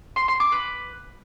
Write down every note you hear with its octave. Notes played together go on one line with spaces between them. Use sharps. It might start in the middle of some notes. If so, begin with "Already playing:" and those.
C6
C6
D6
B4